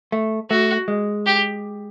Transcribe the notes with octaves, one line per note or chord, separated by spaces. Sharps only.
A3
A3 F#4
G#3
G4